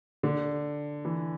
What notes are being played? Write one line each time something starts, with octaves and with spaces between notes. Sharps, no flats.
D3
E3